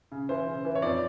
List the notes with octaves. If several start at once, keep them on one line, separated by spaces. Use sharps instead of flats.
C#3
E3 C5
C#3
E3
C#5
F2 D5